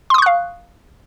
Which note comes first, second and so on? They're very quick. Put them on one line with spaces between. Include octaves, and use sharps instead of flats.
C6 D#6 C#6 F#6 F5